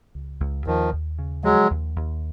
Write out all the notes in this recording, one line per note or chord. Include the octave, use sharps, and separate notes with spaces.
C#2
C#2
D#2 D#3 F3
D#2
C#3
F3 F#3 G#3
D#2
D#2